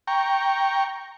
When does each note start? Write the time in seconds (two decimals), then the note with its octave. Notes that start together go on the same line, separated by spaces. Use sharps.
0.08 G5 A#5 C#6